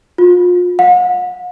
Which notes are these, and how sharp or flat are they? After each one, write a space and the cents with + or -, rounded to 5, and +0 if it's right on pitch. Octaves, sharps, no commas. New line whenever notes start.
F4 +35
F#5 -45